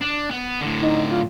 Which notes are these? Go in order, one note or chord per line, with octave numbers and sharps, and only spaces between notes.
D4
B3
A2 D3
D#4
F4